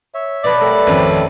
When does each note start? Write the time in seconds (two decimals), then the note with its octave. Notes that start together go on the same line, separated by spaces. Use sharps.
0.14 C#5 E5
0.44 B2 F#3 A4 B4 D5
0.61 G3 A3 A4 A#4
0.87 G#1 F2 C#4